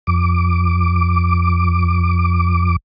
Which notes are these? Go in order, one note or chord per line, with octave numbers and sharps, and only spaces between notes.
F2 D6